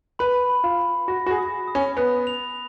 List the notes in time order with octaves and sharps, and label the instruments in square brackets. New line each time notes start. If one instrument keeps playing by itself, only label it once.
[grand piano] B4 [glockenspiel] B5
[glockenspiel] B5
[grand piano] F4
[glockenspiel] B5
[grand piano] F#4 [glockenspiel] A#6
[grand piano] F#4
G#4
[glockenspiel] D#6
D#6
[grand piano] C#4
[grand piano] B3 [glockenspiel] F#6
[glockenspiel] F7